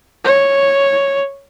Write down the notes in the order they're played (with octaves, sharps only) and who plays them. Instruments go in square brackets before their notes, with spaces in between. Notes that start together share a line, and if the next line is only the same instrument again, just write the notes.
[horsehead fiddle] C#5